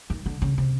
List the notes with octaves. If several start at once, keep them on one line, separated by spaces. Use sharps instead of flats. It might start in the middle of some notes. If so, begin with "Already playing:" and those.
D#3
D3
C#3
C3